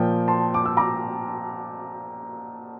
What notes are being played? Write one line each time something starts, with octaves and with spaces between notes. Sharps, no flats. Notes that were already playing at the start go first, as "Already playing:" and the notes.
Already playing: A#2 F3 G5
A5 C6
D6
E6
A#5 D6